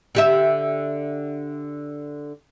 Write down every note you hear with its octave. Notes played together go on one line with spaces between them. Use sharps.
D3 G4 E5